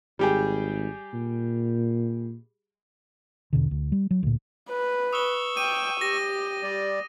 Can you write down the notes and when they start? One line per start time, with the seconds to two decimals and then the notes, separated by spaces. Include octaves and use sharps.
0.19 G#1 G3 G4 G#4
1.14 A#2
3.53 B1 E2 B2 D3
3.71 D2
3.92 G3
4.11 F#3
4.23 D2 A#2
4.70 B4
5.13 C#6 D#6 E6 G7
5.57 G5 D6 D#7
6.01 G4 A#6
6.63 G3 D5